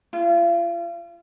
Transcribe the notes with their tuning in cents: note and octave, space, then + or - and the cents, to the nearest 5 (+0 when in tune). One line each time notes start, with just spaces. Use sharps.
F4 -40